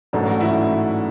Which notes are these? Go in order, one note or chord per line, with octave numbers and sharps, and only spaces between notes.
A1 G#2 F#3 A3 D4
E4